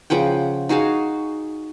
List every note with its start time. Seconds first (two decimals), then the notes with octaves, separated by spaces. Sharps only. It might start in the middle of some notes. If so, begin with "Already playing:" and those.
0.10 C#3 F3 F#5 G5
0.69 D#4 F#4 G#4 F5